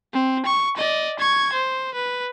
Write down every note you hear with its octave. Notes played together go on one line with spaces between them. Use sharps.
C4
C#6
D5 D#5
C#6 G#6
C5
B4